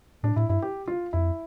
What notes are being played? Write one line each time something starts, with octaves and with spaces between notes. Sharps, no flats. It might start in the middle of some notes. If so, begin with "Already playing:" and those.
A2 D4
A2 E4
G2 E4
G4
F4
F2 E4